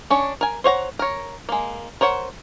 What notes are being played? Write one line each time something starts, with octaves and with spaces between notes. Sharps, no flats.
C#4 D4 C#5
A#4 G#5
C5 C#5 F#5 A#5
A#4 C#5
G#3 A#3
A#4 C5 C#5 F#5